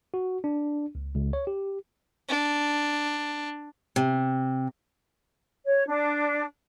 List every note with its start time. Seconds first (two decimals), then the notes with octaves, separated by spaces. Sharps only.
0.14 F#4
0.44 D4
0.95 C#2
1.15 C#2
1.33 C#5
1.47 G4
2.29 D4
3.96 C3
5.65 C#5
5.87 D4